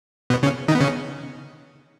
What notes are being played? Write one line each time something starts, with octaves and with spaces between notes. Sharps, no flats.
B2 B3
C#3 C#4
D#3 D#4
B3
C#3 C#4